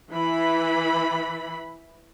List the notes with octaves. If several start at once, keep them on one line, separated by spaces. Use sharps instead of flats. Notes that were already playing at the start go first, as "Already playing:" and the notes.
E3 B5